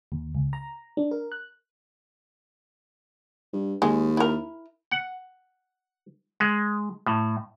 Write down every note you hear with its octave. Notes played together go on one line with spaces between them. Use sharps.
D#2
C#2
A#5
D4
A#4
F#6
G2
D#2 G#3
E4 A#4
F#5
G#3
A2